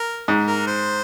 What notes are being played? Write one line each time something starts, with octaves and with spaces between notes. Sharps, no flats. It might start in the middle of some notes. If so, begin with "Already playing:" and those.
Already playing: A#4
G#2
A#4
C5